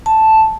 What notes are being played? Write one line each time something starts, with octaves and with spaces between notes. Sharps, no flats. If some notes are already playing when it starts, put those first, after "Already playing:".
A5